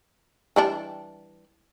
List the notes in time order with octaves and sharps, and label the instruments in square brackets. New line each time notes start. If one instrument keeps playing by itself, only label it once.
[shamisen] E3 G3 D4